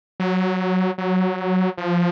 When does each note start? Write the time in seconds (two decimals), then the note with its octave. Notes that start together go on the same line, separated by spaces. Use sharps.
0.20 F#3
0.98 F#3
1.78 F3